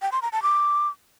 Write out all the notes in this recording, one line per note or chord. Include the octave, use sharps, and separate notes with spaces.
G5
C6
A#5
A5
D6